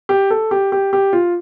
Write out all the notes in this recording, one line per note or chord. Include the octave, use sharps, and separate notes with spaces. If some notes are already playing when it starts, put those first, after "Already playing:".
G4
A4
G4
G4
G4
F4